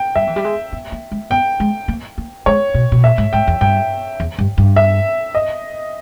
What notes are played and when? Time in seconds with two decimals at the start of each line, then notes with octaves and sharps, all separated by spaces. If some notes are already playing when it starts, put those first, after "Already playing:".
Already playing: G5
0.16 G3 E5
0.27 E3
0.36 G3
0.45 G#3
0.72 B3
0.92 A#3
1.12 G#3
1.30 B3 G5
1.60 G#3
1.88 A#3
2.18 A#3
2.46 G#3 C#5
2.74 B2
2.92 B2
3.04 A#2 E5
3.18 G#2
3.33 G#2 G5
3.47 E2
3.61 G2 G5
4.20 E2
4.39 G2
4.58 G2
4.76 E5
5.35 D#5